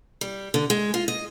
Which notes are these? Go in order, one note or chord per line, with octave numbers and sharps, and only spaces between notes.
G3
D3
G#3
F4
D#5